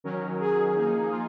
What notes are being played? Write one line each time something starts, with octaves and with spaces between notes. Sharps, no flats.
D#3 F#3 C#4 A#4
G#4
F3 A#3 D#4
F4